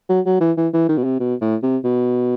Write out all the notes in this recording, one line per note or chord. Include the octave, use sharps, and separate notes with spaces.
F#3
F#3
E3
E3
E3
D#3
B2
C3
B2
A2
C3
B2